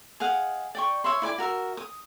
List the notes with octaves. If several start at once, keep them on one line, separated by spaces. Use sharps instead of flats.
G#4 D#5 F5 F#5
D5 G5 C#6
C#5 E5 B5 C6
E4 D5 G#5 D6
F#4 A#4 E5
D#6